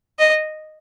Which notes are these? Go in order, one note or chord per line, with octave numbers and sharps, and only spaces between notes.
D#5